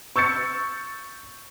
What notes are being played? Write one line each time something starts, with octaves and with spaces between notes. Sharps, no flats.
C#6 E6 G6 A6 C#7